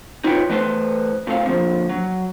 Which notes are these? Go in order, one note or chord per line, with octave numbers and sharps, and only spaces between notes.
D#4 F4 B4 C#5 G5
E3 A3 B4 C5 F#5 C6
A#2 A3 C4 F5
D3 F3 A#3
F#3